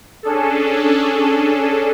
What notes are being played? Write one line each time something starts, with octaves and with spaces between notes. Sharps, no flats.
C#4 D4 G#4 A4